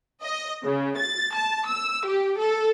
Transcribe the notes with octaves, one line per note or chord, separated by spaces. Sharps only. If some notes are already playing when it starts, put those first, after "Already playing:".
D#5
C#3
A6
A5
E6
G4
A4